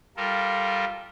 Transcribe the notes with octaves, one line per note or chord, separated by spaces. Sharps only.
G3 F4 A4 A#4